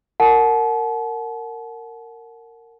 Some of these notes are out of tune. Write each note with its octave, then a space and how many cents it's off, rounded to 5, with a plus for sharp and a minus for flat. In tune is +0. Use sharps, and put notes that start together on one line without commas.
A#4 -20 F#5 -5 A5 -40